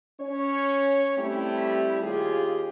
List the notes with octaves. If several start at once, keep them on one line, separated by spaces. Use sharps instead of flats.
C#4 C#5
G3 A3 C4 E4 G4
D#2 F4 G4 G#4